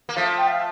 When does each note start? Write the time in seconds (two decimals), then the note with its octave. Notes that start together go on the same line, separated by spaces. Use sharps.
0.09 A#3
0.16 F3 A3 F5
0.37 G5
0.48 F5